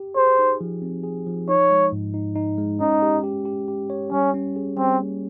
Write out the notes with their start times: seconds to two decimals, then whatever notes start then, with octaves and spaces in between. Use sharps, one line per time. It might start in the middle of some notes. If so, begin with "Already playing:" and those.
Already playing: G4
0.16 G#4 C5
0.39 D#4
0.61 F3
0.82 C4
1.03 G#4
1.27 F3
1.49 D#4 C#5
1.71 G#3
1.92 G#2
2.14 D#4
2.36 D#4
2.58 G#3
2.80 C#4 D#4
3.02 G4
3.24 G4
3.45 G4
3.68 G4
3.90 C#5
4.11 G3 C#4
4.34 C#4
4.56 G#4
4.77 G3 C4
5.00 A#3